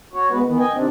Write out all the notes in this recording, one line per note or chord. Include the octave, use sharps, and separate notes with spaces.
F#4 C#5
G#3 B3 F#4 B4
D#3 E3 B3
D#5 G5 G#5
C3 D#3 C4 D4